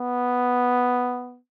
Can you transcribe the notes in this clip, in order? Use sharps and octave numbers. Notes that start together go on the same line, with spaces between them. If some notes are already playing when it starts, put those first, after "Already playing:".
Already playing: B3